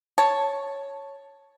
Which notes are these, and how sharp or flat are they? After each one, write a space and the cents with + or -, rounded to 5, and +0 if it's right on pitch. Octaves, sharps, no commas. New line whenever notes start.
C#5 +0 A5 +0